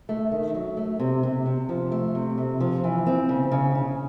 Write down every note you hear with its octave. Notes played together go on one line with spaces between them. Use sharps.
A3
D#3
F#3
A3
C3
C3
C3
F3
A3
C3
C3
F3
E3
C4
C#3
C#3
C#3